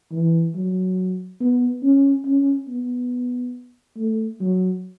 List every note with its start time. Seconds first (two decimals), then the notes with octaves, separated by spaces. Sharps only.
0.12 E3
0.55 F#3
1.40 B3
1.83 C#4
2.26 C#4
2.68 B3
3.97 A3
4.40 F#3